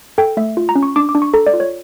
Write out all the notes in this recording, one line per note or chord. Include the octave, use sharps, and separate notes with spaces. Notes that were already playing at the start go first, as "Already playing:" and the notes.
A4 G5
A3 E5
F4
A#5
C#4
C#6
D4 D6
D6
D4
C#6
A4 A#5
D5
F4
C#5